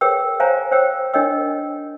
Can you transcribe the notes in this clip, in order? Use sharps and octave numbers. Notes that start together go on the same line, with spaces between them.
G#4 A#4 B4 C#5 G5 E6
C5 C#5 F5 G#5 A#5
C5 C#5 G5 E6
D4 A#4 C#5 D#5 G5 E6